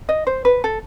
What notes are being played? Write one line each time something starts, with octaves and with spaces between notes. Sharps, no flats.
D#5
C5
B4
A4